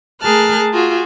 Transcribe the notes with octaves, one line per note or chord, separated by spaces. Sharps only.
A3 G#4 A#4 A5 F6 F#6
F4 F#4 G#4